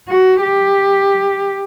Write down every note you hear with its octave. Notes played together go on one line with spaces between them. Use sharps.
F#4
G4